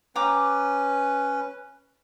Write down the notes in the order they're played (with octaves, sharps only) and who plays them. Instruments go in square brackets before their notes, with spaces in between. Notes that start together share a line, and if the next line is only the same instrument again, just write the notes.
[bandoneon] C#4 B4 [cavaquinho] G5 A#5 D6